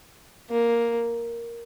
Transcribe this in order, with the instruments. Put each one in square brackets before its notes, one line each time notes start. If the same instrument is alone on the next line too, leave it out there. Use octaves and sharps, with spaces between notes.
[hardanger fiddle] A#3